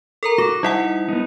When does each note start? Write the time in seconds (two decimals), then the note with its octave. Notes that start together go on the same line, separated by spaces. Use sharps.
0.23 A4 A#4 A#5
0.38 F#4 D6
0.63 G3 D#4 E4 E5 F#5
1.09 B3 D#4